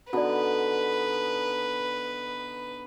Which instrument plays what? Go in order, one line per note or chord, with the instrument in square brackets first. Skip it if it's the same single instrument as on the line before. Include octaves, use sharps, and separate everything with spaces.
[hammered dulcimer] D3 B3 D#4 [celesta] F#4 A4 D5 [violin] B4